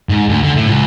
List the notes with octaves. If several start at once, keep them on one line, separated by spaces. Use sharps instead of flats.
G#2
D2
D3
A2
C#2